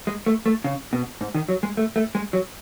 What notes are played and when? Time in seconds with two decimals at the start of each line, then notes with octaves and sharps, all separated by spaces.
0.07 G#3
0.26 A3
0.46 A3
0.64 C#3
0.93 B2
1.21 G#2
1.35 D#3
1.49 F#3
1.63 G#3
1.77 A3
1.96 A3
2.15 G#3
2.33 F#3